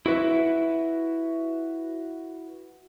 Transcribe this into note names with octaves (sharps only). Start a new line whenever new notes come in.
E4 F#4 B4 E5